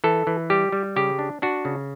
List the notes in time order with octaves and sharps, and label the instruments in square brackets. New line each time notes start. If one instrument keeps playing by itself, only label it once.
[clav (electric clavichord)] E3 A4
E3
G3 G4
G3
C#3 G4
D4
D4 F#4
C#3